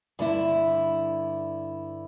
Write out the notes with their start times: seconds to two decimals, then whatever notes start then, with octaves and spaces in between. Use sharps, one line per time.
0.19 G2 D3 E4